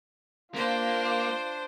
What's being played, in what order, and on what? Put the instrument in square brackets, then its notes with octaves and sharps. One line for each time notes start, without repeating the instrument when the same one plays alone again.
[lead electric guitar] A#3 [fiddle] D4 C5 [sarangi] F4